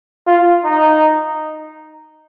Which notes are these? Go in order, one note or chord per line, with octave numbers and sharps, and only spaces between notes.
F4
D#4